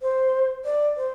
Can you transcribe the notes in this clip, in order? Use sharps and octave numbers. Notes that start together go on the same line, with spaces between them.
C5
D5
C5